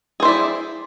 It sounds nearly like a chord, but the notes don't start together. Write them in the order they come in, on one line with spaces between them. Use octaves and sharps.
G#4 C5 E4 D5